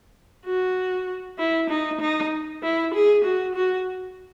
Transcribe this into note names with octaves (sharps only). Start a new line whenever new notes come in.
F#4
E4
D#4
D#4
E4
G#4
F#4
F#4